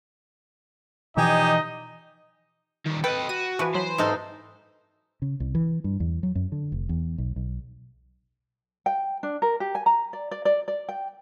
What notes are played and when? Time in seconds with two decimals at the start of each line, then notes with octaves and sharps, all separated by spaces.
1.17 B2 E3 F3 D#4 G4 D5 D#5 G#5
2.86 D#3 G3
3.04 A4 B4 D#5 G5
3.29 F#4 D#7
3.59 E3 F3 F#4 B4
3.75 F#3 C5 B5
3.98 G#2 C3 D#4 A4
5.22 C#3
5.40 C2
5.55 E3
5.84 G2
6.00 E2
6.23 F#3
6.35 F#2
6.52 D3
6.72 F1
6.89 E2
7.18 B1
7.36 B1
8.86 G5
9.23 D4
9.42 A#4
9.60 G4
9.75 G#5
9.86 A#5
10.13 D5
10.31 D5
10.45 D5
10.68 D5
10.89 G5